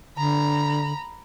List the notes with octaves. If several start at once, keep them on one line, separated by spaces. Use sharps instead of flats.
D3 A#5 B5